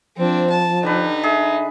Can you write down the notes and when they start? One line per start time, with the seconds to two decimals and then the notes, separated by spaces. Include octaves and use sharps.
0.17 F3 C4 D4
0.50 A5
0.83 D3 D#4 G4 B4
1.24 G#4 E5